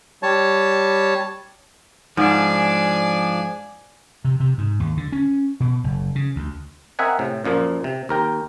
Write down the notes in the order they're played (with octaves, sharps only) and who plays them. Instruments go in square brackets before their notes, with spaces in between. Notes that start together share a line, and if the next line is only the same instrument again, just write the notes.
[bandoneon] G3 C#5 A5
[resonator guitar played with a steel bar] G#2 [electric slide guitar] F3 D4 [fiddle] D5 G#5
[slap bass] C3
C3
G#2
D#2
D3
C#4
B2
F#1
C#3
D2
[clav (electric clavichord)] C4 A#4 D#5 E5 F#5 G#5
A2 C3
F#2 A#2 F3 A#3
C3
D#2 A#4 G5